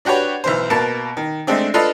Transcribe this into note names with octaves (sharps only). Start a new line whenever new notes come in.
D4 F#4 G4 B4 C#5
B1 E3 C5
B2 A#3 A5
D#3
G#3 A3 C4 D4
D4 F4 A4 B4 D#5